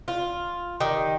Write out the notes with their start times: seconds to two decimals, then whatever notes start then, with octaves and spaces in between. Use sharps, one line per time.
0.08 F4
0.80 D#3 G4